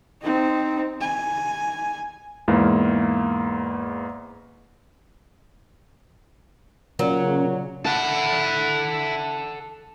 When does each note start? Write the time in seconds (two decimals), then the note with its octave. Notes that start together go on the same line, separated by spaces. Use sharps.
0.22 C4 D#4
1.01 G#5
2.48 E2 G#2 A#3 E4 F5
6.99 A#2 C#3 F#3
7.86 E4 A4 F#5 A5